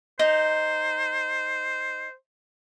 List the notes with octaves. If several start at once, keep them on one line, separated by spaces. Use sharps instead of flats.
D#4 C5